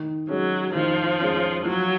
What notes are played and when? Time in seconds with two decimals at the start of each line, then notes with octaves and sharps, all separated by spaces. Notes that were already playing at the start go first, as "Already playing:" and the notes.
Already playing: D#3
0.29 F#3 G#3 C#4
0.75 D#3 F3
1.20 G#3 C#4
1.65 F3 F#3